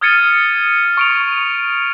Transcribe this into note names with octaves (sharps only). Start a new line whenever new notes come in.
D#6 F6 G#6 A6 C#7 D#7
C#6 D7 F7